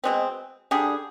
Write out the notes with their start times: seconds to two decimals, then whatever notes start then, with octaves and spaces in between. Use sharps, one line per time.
0.04 B2 G#3 C4
0.71 D3 G3 D4 G#4